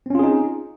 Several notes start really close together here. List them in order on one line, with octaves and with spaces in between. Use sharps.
C4 C#4 F4 G#4 D#4